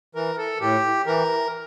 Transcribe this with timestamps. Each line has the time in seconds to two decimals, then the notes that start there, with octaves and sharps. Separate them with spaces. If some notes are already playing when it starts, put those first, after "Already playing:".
0.15 E3 A#4
0.38 A4
0.60 A2 G4
1.06 E3 A#4